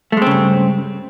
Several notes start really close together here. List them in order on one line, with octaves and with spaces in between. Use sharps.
A3 G#3 C4 C#3 G2